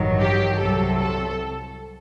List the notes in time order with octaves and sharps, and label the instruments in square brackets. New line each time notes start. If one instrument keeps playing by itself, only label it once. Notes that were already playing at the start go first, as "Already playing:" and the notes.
Already playing: [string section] A1 G2 D#3 F#3
G4
C2 C3 F#3 A4
A4